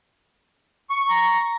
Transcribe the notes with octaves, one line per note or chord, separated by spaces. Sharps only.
C#6
A#5